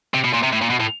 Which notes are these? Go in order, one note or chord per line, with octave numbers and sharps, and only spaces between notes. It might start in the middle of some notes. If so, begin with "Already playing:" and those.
C3
B2
A#2
C3
A2
A#2
B2
A2